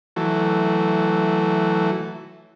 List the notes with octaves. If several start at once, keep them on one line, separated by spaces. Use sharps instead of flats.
E3 F#3 A3